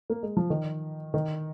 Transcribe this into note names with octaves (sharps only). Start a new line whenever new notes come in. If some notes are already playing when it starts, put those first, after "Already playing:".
A#3
G#3
F3
D#3
D#3